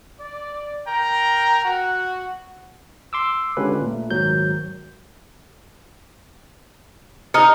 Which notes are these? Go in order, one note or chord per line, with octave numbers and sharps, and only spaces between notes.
D5
A#4 G5 A#5
F#4 F#5
C6 D6 E6
D3 G#3 C#4 F4 G4 B4
A#2 A3
B1 G#2 D#3 F#3 G6
D#4 D#6 F6 C#7